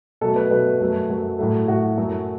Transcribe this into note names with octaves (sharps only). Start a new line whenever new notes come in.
B2 F#3 A3 A4
B4
B2 F#3 A3 B4
F#2 F#3 A3
F#2 F#3 A3
A2 F#3 A3
A2 F#3 A3 F#4
F#2 F#3 A3